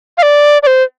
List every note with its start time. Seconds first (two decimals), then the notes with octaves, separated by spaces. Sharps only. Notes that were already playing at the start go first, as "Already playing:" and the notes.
0.18 F5
0.23 D5
0.63 D5
0.67 C5